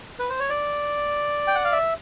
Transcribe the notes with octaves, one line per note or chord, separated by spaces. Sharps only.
B4
C5
C#5
D5
G5
F#5
F5
E5